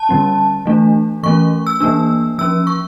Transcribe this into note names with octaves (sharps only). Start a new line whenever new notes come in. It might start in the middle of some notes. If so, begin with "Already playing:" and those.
Already playing: A5
D3 G3 C#4
E3 A3 D4
E3 A3 C#4 C#6
E6
E3 A#3 D4 E6
F3 C#4 E6
C#6